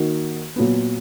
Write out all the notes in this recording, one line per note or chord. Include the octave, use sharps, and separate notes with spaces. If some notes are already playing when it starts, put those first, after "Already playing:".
Already playing: D#3 A#3 D#4 F#4
A#2 F#3 B3